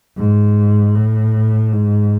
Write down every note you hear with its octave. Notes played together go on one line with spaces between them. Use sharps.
G#2
A2
G#2